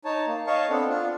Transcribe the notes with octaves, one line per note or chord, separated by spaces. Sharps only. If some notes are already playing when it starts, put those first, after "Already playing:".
D#4 C#5 A5
A#3
C#5 D#5 F5 A5 C#6
B3 C4 D4 A4
D4 F4